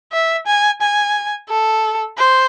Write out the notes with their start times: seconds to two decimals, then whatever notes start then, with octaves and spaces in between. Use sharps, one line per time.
0.12 E5
0.47 G#5
0.81 G#5
1.49 A4
2.18 C5